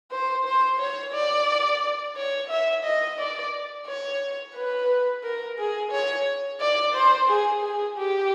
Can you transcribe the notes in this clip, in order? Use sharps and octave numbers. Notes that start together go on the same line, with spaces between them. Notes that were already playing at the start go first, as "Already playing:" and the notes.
C5
C5
C#5
D5
C#5
E5
D#5
D5
C#5
B4
A#4
G#4
C#5
D5
C5
G#4
G#4
G4